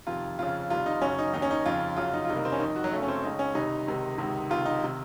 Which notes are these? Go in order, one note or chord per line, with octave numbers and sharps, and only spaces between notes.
F2 C3 D#3 F4
F2 C#3 F4
C2 C3 D#3 F4
D#4
F#2 C#3 C#4
D#4
D#2 D#3 D#4
C#4
D#4
F2 C#3 F4
F#2 C#3 F4
D#4
F4
C2 C3 D#3 D#4
A#3
C4
C#4
F2 D#3 D#4
F#4
F#3
F#2 C#3 A3
C#4
C4
C#2 C#3 D#4
C#4
C2 C3 D#3 D#4
C#2 C3 D#3
C#2 C3 D#3
C#2 C3 D#3 F4
D#4
C3 D#3